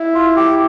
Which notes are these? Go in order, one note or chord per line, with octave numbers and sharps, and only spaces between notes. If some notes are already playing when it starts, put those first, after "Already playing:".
Already playing: E4
F4
G4